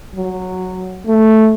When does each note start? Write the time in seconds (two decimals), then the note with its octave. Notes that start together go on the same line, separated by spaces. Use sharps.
0.16 F#3
1.06 A3